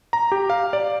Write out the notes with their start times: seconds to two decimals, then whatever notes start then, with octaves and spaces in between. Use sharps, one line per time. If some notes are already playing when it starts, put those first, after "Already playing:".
0.13 A#5
0.32 G4
0.50 F5
0.73 D5